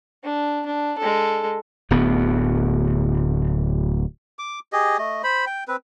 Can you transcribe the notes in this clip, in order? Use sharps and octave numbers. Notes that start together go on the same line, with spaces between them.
D4
D4
G#3 A4
D1 D2 B3
D6
G4 G#4 D#5
A3 D#5
C5 B5
G5
C4 B4